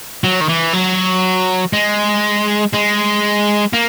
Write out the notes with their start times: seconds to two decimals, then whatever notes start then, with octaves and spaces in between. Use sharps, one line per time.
0.24 F#3
0.41 D#3
0.49 E3
0.74 F#3
1.73 G#3
2.74 G#3
3.73 A#3